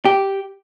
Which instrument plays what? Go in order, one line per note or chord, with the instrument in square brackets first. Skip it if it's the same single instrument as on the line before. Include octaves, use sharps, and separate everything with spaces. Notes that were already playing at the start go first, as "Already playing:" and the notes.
[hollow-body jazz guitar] G4